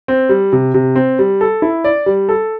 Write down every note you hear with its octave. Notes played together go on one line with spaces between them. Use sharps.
C4
G3
C3
C3
C4
G3
A4
E4
D5
G3
A4